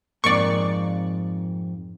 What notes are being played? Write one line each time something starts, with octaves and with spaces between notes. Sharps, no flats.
F2 G#2 A#3 D5 C#6